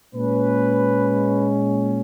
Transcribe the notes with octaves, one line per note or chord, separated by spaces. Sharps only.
A#2 G#3 C#4 B4